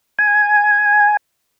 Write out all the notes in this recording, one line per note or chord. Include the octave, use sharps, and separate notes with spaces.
G#5